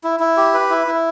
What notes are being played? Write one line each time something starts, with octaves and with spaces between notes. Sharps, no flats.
E4
E4
G4
B4
E4
E4